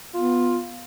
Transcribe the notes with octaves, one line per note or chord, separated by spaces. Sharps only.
B3 F4